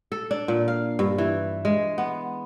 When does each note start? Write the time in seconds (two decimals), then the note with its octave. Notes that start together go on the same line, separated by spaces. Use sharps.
0.12 A4
0.31 D4
0.48 A#2
0.68 F5
0.99 G2
1.18 E3
1.65 G#3
1.98 B3